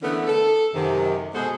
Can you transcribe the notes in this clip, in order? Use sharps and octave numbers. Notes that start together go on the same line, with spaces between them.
D3 E3 A3 B3 C#4 A#4
A4
F#2 C3 D#3
B2 G#3 F#4 G#4 A4 C5